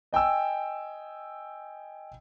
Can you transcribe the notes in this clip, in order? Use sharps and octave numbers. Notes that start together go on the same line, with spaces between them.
D#5 G5 G#5 E6